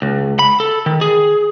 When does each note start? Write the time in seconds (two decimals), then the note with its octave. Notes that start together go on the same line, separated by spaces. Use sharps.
0.02 C#2
0.39 B5
0.60 A4
0.86 D#3
1.01 G#4